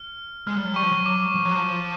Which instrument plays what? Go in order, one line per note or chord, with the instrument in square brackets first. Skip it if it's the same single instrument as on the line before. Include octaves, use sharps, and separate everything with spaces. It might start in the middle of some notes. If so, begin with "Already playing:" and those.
Already playing: [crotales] F6
[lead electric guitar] G#3 [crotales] F6
[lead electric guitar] G3
F#3
[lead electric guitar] G3 [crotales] C#6
[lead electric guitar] F3
F#3
[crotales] D6
[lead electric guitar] F3
F#3
F3